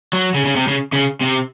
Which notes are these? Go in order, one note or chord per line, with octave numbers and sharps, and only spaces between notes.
F#3
C#3
C#3
C3
C#3
C#3
C3